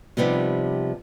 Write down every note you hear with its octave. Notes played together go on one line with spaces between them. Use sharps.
C3 F3 G3 B3 D#4 G4